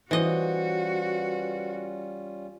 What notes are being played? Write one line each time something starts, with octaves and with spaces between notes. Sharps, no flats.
E3 G3 C#4 F4 F#4 B4 C5 D#5